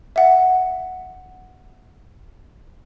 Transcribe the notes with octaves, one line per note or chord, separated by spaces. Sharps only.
E5 F#5